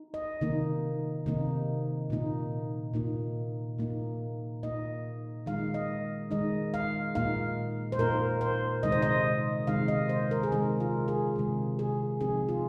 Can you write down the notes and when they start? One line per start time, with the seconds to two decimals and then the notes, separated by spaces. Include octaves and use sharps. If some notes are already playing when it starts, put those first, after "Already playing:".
Already playing: D#4
0.14 D#5
0.41 C3 D#3 A#3 D#4
1.26 C3 D#3 A#3 D#4
2.10 A#2 A#3 D#4
2.94 A#2 A#3 D#4
3.78 A#2 A#3 D#4
4.63 A#2 A#3 D#4 D#5
5.46 D#3 G#3 D#4 F5
5.74 D#5
6.31 D#3 G#3 D#4 D#5
6.74 F5
7.15 A#2 A#3 D#4 F5
7.92 C5
7.99 A#2 A#3 D#4 A#4
8.41 C5
8.83 C3 D#3 G#3 D#4 D#5
8.92 C5
9.02 D#5
9.67 C3 D#3 G#3 D#4 F5
9.88 D#5
10.09 C5
10.31 A#4
10.43 G#4
10.52 C3 D#3 G#3 A#4
10.80 F4
11.08 G#4
11.36 C3 D#3 G#3
11.79 G#4
12.20 C3 F3 C4 D#4 G#4
12.49 F4